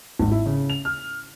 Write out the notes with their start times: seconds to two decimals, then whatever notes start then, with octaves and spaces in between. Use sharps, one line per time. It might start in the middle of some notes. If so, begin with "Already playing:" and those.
0.19 G#1
0.31 E4
0.46 C#3
0.70 F7
0.85 F6